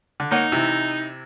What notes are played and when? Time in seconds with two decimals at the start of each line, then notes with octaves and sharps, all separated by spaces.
0.20 D3
0.31 A#3 D#4 C#5 F#5
0.52 C3 E3 E4